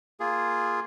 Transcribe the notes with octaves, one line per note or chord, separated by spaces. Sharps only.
A#3 F4 G#4